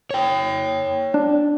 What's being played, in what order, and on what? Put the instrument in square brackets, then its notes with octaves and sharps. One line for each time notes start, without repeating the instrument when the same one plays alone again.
[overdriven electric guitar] C#5 G5
[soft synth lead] D4